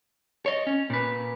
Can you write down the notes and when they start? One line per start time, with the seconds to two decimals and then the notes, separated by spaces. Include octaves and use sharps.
0.46 C#5 D#5
0.67 C#4
0.90 A#2 B4